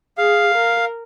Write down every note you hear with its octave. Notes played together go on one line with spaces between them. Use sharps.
G#4 F5
A#4